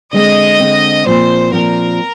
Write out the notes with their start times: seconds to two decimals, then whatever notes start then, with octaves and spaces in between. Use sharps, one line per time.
0.13 D3 G#3 C4 D#5
0.60 D3 G#3 C4
1.06 A#2 F3 C4 F4 C5
1.53 A#2 F3 C4 F4 A#4